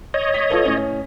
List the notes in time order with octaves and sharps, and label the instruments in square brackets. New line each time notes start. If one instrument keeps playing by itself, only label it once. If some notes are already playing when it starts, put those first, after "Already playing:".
[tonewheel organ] C#5 D#5
[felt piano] B6
F4 A4 B4
A2 C#4